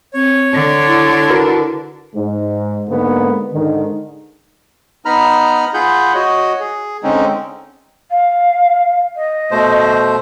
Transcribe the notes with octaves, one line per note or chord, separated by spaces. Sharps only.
C4 C#5
D3 D4
E4
F#4 A#4 B4
G#2
G#2 D3 A#3 B3
G#2 D3 D#3
B3 D#4 A#5 B5 F6
F4 G#4 F#5 B5 G6
F#4 C#5 D#5
G#4
D3 G#3 C4 C#4 D#4
F5
D#5
B2 A3 C5